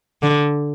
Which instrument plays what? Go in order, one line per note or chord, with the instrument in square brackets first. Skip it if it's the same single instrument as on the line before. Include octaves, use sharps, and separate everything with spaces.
[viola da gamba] D3